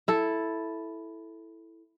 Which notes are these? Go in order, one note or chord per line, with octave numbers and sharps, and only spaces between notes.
E4 A4